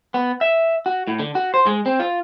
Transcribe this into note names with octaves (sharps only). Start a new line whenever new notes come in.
B3
E5
F#4
A2
D3
F#4
C5
G#3
C4
F4